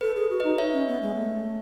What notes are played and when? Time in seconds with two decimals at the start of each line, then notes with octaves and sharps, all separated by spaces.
0.01 A4 B4
0.16 G#4
0.30 F#4
0.40 D#4 B4 D#5
0.58 C#5 E5
0.73 C#4
0.88 B3
1.02 G#3
1.16 A3